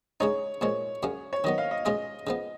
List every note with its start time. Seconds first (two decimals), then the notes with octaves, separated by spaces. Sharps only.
0.20 C#3 G#3 D#4 C#5
0.61 A#2 F3 G#3 C#5
1.03 F#2 C#3 F#3 C#4
1.33 C#5
1.44 D#3 F#3 B3 D#5
1.58 F5
1.71 D#5
1.85 B2 G#3 C#4 F4 G#4 D#5
2.27 C#3 F3 B3